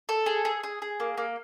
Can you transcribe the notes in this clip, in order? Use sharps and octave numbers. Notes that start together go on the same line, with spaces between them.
A4
G#4
G#4
G#4
G#4
A#3
A#3